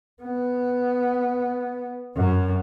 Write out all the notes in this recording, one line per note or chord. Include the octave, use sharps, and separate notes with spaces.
B3
F#2